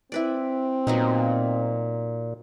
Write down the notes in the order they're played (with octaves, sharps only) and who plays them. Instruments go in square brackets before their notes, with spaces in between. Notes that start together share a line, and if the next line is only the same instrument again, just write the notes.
[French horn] C4 [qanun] E4 B4 D5
[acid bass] A#2 [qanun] F#3 B3 D#4